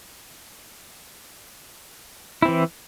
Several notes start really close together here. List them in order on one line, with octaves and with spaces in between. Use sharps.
E4 C4 E3